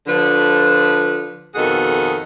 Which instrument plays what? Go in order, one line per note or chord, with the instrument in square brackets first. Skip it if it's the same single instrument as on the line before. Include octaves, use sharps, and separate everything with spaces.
[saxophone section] D3 F3 B4
F2 B2 D#3 G#4 A4 F#5